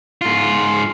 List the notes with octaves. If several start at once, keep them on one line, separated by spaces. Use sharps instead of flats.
G#2 F4